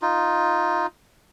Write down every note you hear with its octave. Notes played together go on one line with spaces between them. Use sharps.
D#4 F4